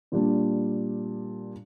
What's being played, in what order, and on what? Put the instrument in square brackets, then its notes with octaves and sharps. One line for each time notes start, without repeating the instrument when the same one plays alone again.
[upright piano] A#2 G3 D4